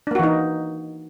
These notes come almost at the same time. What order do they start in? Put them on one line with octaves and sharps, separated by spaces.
D4 A#3 F#4 E3 D#4